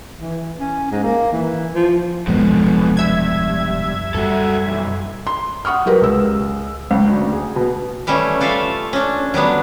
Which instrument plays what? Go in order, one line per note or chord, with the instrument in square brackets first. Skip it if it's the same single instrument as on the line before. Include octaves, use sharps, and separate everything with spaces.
[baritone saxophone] E3
C#4
G#2
A#3
E3
F3
[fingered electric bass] D#1 F3 G#3 [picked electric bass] C2 F#2 B2 [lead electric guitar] D3 B3
[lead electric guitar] G2 [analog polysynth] E5 G#6
[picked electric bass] F#2 G3 [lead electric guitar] F#4 A4
[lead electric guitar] B1 E2
[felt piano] C6
F#5 C#6 D#6 F6
F#3 G4 A#4 B4
C#2 E6
[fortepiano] C#2
D2
G#4
B2
[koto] E3 G3 A3 C#4
F4 A4 D5 E5 F5
C#4 D4
F#3 G3 B3 D4